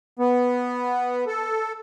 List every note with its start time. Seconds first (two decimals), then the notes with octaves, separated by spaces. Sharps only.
0.19 B3
1.27 A4